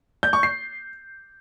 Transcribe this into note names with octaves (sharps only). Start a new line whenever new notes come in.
G6
C#6
C7